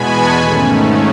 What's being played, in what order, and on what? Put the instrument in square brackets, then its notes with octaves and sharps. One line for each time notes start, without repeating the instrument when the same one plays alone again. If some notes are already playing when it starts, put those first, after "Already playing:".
Already playing: [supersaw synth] E2 B2 G#3 B3 G#5 A5 B5 C#6
G#2 D#3 A3 C#4